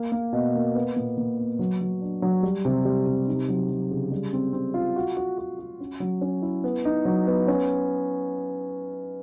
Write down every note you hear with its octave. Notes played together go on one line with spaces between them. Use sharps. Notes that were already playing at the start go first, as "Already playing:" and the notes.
Already playing: A#3
A#3
B2
A#3
B3
A#2
A#2
B3
F#3
F#3
D4
F#3
G3
C3
G3
C3
D#4
F#3
F#3
C#3
G3
C4
C4
F4
F#4
F#4
F#4
F#4
C#4
F#3
C#4
E4
B3
D#4
F#3
B3
C#4